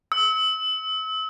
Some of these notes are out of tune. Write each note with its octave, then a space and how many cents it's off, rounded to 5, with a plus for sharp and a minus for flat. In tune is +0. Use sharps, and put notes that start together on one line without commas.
E6 -40